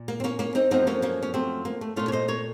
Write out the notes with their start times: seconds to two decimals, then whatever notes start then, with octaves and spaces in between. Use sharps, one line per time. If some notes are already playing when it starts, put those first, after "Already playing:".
Already playing: A#2
0.08 A#3
0.20 C4
0.24 A#3 C#4
0.39 A#3 C#4
0.55 C4 D#4
0.71 F#2 F3 A3 C4 D#4
0.87 A#3 C#4
1.02 A#3 C#4
1.22 C#4
1.34 A3 C4
1.65 A#3
1.81 A3
1.96 A#2 A3 C#4 F4
2.08 C#5
2.12 C5 D#5
2.28 A#4 C#5